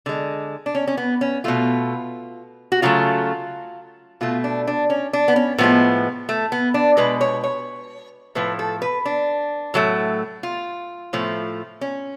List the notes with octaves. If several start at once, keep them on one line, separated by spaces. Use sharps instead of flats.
D3 G#3
D4
C#4
C#4
B3
C#4
B2 A3 F4
F#4
C#3 F#3 A3 F4
B2 A3 F4
D4
D4
C#4
D4
B3
C#4
A2 F3 G#3 B3
A3
B3
D4
B2 G#3 B4
C#5
C#5
A2 F3 A3 B4
A4
B4
D4
A2 F#3 A3
F4
A2 F3 A3
C#4